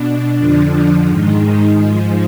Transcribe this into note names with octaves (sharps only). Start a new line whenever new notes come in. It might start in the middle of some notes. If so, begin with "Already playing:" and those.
Already playing: B2 D4
F2 D3 F3
G#2 D#3 G#3
G#2 F3